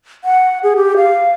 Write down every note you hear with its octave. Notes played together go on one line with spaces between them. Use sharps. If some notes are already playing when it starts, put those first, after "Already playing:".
F#5
G#4
G4
F5